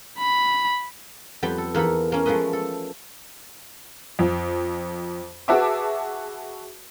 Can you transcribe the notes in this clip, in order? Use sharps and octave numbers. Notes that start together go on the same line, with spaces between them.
B5
F2 G3 B3 G5 B5
A4
E2 A#3 D#4 A4 B5
A#3 C#4
F3 G#3 A3 B4 D#5
A4
F2
F#4 G#4 B4 E5 A5 D6